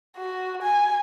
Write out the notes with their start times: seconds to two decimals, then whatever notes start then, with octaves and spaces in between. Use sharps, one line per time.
0.17 F#4
0.62 G#5